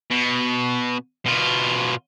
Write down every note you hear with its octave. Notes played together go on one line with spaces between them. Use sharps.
B2
B2 F4